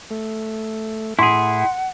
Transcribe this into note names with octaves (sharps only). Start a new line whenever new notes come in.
A3
A2 E4 G#4 F#5 C6